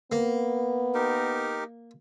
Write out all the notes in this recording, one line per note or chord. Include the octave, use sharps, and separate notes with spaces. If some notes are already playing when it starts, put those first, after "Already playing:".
A#3 B3
D#4 G4 A#4